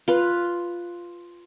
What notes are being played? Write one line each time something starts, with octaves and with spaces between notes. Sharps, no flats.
F4 B4